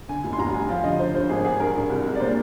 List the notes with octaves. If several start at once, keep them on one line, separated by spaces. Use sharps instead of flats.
D3 G#5
F1
C6
F1 A#5
G3 G#5
F3 F5
D3 D#5
D3 C5
G2 C5
G#1 G#4
G#1 G#4
G2 A#4
G2
C2
G#3
D5
A#2 C5